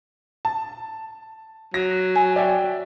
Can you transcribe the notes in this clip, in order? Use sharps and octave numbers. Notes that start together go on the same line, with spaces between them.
A5
F#3 A#6
G#5
D5 E5 G5